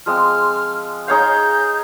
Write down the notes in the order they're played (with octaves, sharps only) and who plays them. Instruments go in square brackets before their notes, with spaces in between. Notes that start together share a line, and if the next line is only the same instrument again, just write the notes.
[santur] F3 G#3 C4 [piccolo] F6
[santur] D#4 G#4 C#5 F5 [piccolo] G6